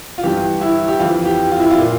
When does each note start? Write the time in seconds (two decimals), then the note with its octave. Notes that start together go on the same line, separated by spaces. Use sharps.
0.18 F4
0.24 G2 E3 G4
0.61 E4
0.88 G4
0.99 F2 E3 F4
1.25 G4
1.51 F4
1.60 E4
1.71 F4
1.78 A#2